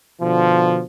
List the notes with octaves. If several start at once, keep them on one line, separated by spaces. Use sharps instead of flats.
B2 D3 F3